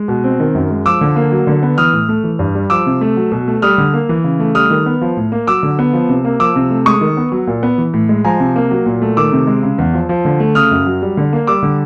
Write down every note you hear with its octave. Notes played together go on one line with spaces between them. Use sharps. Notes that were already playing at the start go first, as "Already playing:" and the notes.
Already playing: G#3
B2
C4
D#3
F#2
G#3
F3 D6 E6
D3
A#3
F#3
D3
B3
E3 D#6 F6
A2
A3
E3
G2
G3
F3 D6 E6
C3
A3
F#3
B2
A3
G3 D#6 F6
D3
A#3
E3
C#3
A3
G3 D#6 F6
D#3
B3
F3
A2
A#3
F#3 D6 E6
D3
B3
F3
C3
A#3
F3 D6 E6
C3
A3
G#3 C#6 D#6
D#3
B3
F#3
A#2
B3
E3
A2
G#3
F3 G#5 A#5
C3
A#3
F#3
A#2
A3
D#3 D6 E6
C3
G#3
C#3
E2
F3
F3
D3
A3
C#3 D#6 F6
F#2
F#3
G3
D3
A#3
G3 D6 E6
D3